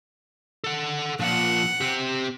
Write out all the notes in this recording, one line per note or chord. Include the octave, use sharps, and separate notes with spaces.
A4 F#5
A#2 F3 F#5
C4 G4